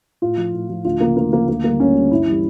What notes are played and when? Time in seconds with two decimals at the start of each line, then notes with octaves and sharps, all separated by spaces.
0.22 A2 F4
0.38 F3
0.54 A2
0.69 F3
0.85 D2 F4
1.01 C#3 F3 A#3
1.16 D2 A#3
1.32 C#3 F3 A#3
1.48 D2 A#3
1.64 D3 G3 A#3
1.80 D2 C#4
1.95 D3 G3
2.11 G2 E4
2.27 E3 G3